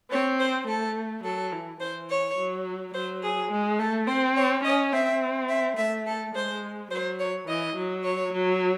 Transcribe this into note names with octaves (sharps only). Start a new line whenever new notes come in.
C4 C#5
C5
A3 A4
F#3 A4
E3
E3 C5
C#5
F#3
F#3 C5
G#4
G#3
A3 A4
C4 C5
C#5
C#4 D#5
C4 E5
E5
A3 E5
A4
G#3 C5
F#3 C5
C#5
E3 D#5
F#3
C#5
F#3